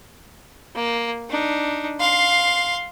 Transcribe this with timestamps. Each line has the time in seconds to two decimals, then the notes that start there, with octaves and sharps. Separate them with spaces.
0.75 A#3
1.30 D4 D#4
2.00 F5 C6